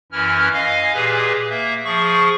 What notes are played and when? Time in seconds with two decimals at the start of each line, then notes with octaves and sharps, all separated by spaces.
0.12 F#2 E3 C#4 E4 F6
0.53 D#5 F5 G#5
0.94 A#2 G4 G#4 B4
1.50 A#3 E5
1.85 F3 G#4 C#6